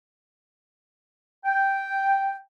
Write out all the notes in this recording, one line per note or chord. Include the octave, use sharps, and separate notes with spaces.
G5